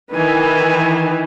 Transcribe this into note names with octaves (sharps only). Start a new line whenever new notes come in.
D#3 E3 B4 G#5